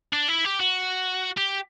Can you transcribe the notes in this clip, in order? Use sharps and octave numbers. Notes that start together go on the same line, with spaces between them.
D4
E4
G4
F#4
G4